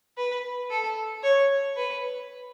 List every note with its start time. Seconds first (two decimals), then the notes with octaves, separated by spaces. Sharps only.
0.18 B4
0.70 A4
1.23 C#5
1.77 B4